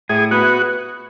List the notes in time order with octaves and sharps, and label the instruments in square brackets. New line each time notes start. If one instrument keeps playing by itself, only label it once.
[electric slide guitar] A2 [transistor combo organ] G#4
[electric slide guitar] B3 [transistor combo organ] F#4